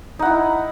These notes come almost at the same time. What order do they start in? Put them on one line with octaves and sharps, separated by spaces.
D#4 F#5 E4